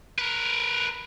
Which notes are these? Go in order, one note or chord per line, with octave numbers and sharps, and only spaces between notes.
A#4 B4